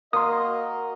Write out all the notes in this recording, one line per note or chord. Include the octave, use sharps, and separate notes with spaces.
A#3 F#4 A#4 D#5 C6 D#6